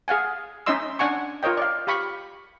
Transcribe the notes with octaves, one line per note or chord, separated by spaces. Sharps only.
G#4 F5 F#5 G#5
C#4 D#4 D#5 E5 C6 E6
D4 F#5 G#5 C#6
F4 A#4 C#5 D#5 G5
D5 F5
G4 F5 B5 C#6